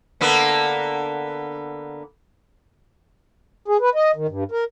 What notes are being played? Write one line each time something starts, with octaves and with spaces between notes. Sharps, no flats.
D3 A#3 B3
G#4
B4
D#5
D#3
G2
A#4